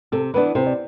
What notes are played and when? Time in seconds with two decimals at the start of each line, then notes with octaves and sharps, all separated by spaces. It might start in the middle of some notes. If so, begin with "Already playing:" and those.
0.12 C3 A4
0.34 E3 B3 D4 B4
0.55 C3 C5
0.66 D5